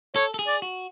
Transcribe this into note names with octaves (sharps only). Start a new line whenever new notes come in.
A4 C#5
A4
G#4
D5
F#4